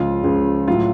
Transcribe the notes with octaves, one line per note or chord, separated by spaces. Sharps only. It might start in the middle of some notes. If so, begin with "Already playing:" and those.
Already playing: C#2 C#3 F3 F4
C#2 C#3 F3
A2 F#3 F4